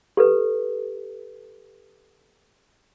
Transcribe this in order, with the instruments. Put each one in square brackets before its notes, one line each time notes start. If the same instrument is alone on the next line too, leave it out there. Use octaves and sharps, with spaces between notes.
[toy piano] G4 A4 B4